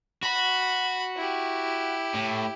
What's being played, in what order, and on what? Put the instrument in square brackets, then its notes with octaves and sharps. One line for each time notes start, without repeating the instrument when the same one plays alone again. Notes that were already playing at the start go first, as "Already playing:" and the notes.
[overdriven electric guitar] F#4 [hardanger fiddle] B5
[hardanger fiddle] E4 G4
[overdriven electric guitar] A2